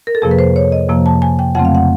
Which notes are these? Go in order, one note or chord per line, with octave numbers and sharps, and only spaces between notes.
A#4
A4
F2 C3 F3 A#3 G#4
B4
C5
C#5
D#5
F2 C3 F3 A#3
A5
G#5
G5
F2 C#3 F#3 A3 C4 F#5
F5
F#5